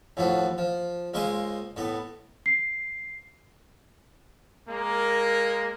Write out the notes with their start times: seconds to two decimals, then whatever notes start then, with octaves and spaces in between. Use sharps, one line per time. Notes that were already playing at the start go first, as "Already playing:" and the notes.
0.17 D#2 A2 F3 F#4
0.58 F3
1.14 C#2 G#3 A#3 C5 D#5 G#5
1.77 A2 B3
2.46 C7
4.69 G#3 A#3 A#4